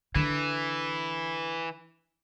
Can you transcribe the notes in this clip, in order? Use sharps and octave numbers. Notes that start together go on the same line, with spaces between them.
D3 E3